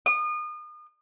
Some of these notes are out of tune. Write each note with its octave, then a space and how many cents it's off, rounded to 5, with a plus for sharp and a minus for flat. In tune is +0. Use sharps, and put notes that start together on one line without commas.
D#6 -35